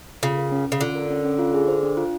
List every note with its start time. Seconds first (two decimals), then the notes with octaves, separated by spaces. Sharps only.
0.23 C#3 F4
0.37 A#4
0.52 C#4
0.66 C#4
0.72 C#3
0.81 D3 F4
0.95 A#4
1.10 C#4
1.24 C#4
1.39 F4
1.54 G#4
1.68 C5
1.83 D4
1.97 F4